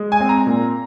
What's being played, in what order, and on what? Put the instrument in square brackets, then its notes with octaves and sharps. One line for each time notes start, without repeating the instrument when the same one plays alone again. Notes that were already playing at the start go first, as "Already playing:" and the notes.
Already playing: [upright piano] G#3
G#5
C4
A#5
A#2